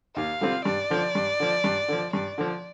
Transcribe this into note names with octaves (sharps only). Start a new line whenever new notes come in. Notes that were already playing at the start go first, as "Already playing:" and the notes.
D#2 F5
D3 G3 C4 F4
G2 D5
D3 F3
G2
D3 F3
G2
D3 F3
G2 D5
D3 F3